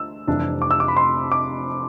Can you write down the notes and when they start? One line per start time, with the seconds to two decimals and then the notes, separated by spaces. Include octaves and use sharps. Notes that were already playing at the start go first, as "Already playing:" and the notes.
Already playing: D2 E6
0.27 F1 F2 E3 G3 D4
0.62 D6
0.71 E6
0.80 D6
0.88 B5
0.97 C6
1.32 D6